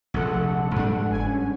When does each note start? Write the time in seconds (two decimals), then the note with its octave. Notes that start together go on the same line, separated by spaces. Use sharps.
0.14 F1 A#1 A4 F#5
0.76 G#2 G3 D4
1.10 G1 G#5
1.26 C#4